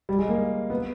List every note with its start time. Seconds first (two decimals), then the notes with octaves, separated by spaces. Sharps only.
0.09 G3
0.19 G#3
0.29 A#3
0.70 B3